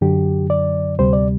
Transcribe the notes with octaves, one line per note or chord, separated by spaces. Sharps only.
F#2 D3 F#3 G4
D5
D2 C3 G3 C5
D5